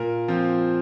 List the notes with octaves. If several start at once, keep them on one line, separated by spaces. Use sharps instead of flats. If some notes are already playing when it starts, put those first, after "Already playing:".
Already playing: A#2 A#4
F3 C4